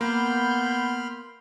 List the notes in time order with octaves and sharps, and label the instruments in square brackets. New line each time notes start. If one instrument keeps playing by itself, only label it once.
[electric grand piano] A#3 [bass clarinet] B3 [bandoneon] B5 C6 F6 [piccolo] G6